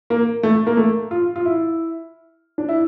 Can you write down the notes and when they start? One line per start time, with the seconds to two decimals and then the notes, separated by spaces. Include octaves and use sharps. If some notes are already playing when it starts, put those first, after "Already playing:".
0.10 A#3
0.43 A3
0.67 A#3
0.77 A3
1.11 F4
1.36 F4
1.45 E4
2.58 D4
2.69 E4